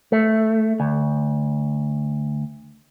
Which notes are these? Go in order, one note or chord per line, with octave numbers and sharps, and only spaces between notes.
A3
D2